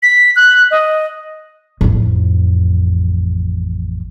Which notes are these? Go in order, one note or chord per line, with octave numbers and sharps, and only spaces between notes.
B6
F#6
D#5
A1 F2